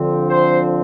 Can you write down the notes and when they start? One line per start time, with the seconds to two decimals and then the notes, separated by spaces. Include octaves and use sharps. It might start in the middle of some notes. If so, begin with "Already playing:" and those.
Already playing: D3 F3 C4
0.28 C5